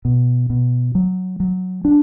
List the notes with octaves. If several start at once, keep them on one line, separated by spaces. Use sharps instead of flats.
B2
B2
F#3
F#3
D4